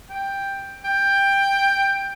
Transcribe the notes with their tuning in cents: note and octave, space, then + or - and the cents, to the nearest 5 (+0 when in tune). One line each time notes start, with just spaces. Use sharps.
G5 +10
G5 +10